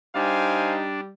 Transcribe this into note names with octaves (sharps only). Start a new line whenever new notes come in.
G3 D4 D#4 C5 F5 G#5